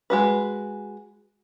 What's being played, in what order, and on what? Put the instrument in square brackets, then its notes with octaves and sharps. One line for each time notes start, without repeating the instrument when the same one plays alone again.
[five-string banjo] G#3 F#4 B4